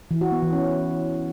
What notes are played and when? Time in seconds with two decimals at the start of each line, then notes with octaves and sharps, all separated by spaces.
0.11 E3
0.21 F#4
0.32 B3
0.42 E3
0.53 C#4